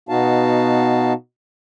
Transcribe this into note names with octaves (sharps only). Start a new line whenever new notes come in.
B2 B3 D#4 F#4 F5 A5